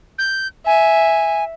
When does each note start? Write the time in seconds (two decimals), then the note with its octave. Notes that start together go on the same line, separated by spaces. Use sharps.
0.18 G6
0.66 E5 G#5